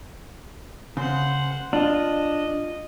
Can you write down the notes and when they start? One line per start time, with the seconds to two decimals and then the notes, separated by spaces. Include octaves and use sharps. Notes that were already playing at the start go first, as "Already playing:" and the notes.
0.97 C#3 C5 F#5
1.73 D4 F4 D#5